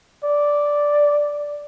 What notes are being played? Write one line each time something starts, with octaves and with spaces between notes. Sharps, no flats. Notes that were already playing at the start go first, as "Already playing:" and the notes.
D5